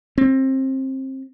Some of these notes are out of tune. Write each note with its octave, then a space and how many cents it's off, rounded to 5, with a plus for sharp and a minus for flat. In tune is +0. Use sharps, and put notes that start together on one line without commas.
C4 +25